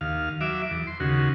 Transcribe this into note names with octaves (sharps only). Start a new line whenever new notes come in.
D#2 F5
F#3 E5 D6
E2
C6
D#2 C#3 F#4